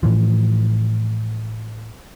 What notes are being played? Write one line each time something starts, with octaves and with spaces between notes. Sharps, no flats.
A2 E3 F3